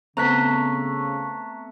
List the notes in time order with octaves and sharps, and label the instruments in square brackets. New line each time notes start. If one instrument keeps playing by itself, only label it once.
[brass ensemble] C#3 [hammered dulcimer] A3 [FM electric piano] B3 C4 [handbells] A#5 F#6 B6